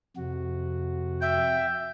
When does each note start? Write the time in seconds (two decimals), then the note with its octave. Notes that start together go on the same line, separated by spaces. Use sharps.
0.17 F2 C3 F#4
1.22 E5 G5